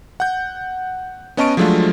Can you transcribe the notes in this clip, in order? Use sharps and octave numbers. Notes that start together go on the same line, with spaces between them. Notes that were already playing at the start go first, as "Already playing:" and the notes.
F#5 G6
B3 C#4 D#5 A5 C#6 D7
F3 F#3 G#3 A3 D4 F4